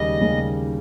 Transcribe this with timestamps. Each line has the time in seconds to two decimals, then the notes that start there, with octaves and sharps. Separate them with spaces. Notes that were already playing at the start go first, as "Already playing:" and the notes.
Already playing: D#2 C#3 G3 D#5
0.21 D#2 C#3 G3